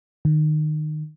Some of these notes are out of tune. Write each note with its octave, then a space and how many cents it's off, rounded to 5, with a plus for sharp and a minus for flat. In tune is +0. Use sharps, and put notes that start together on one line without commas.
D#3 -25